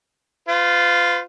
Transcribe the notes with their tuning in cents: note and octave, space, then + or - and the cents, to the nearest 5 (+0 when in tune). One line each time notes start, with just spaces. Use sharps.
F4 +0 B4 +45